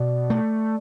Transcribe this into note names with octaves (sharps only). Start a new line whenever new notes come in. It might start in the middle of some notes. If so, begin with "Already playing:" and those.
Already playing: B2 D5
A3